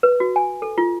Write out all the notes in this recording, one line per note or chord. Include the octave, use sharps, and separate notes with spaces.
B4
F#4
G#5
A4
F4